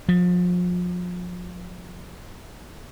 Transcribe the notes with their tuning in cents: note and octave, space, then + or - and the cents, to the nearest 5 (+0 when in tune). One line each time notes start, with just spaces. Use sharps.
F3 +35